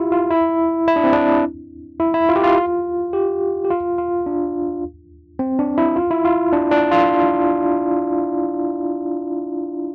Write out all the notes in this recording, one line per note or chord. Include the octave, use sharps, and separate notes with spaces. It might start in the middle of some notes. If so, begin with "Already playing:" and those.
Already playing: E4 F4 G4
F4
E4
E4
D4
C4
D4
E4
E4
F4
G4
F4
G4
G4
F4
F4
D4
C4
D4
E4
F4
E4
F4
D4
D4
F4